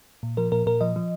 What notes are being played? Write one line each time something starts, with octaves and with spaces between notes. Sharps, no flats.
A#2
F3 A#4
A#2 A#4
A#2 A#4
F3 D#5
F3